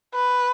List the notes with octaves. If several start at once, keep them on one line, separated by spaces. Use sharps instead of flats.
B4